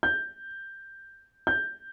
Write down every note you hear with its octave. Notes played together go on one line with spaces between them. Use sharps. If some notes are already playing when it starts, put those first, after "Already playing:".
G6
G6